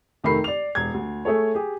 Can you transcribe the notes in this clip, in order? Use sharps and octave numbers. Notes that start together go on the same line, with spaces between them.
F1 D#3 A3 B5 C7
D5 F7
E1 G#6
D2
A3 G#4 A4 C#5
G4 G#4